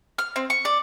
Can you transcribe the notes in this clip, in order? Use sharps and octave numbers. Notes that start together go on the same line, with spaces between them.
F6
C4
C#6
D5